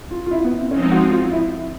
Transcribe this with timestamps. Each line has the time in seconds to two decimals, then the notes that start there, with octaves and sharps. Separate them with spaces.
0.11 F4
0.26 F4
0.31 E4
0.44 B3
0.58 C4
0.71 F3 G#3 C4 C#4 D#4
0.91 F#4
1.11 F4
1.31 E4